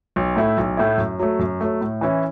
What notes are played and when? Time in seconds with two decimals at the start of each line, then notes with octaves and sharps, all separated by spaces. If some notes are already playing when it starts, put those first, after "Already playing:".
0.16 B1
0.36 A2 A3 E4
0.58 B1
0.77 A2 A3 E4
0.98 F#2
1.20 F#3 A3
1.39 F#2
1.61 F#3 A3
1.81 A2
2.01 E3 C#4 E4